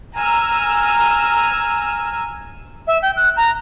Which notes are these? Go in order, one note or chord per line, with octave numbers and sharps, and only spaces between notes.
G#5 A#5 E6 F6
E5
G5
F#6
A#5